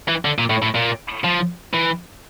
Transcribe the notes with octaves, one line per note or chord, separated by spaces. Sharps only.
E3
D3
A#2
A2
A2
A#2
F3
E3